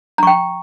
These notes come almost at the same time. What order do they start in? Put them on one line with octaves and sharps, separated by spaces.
A#5 C#6 G5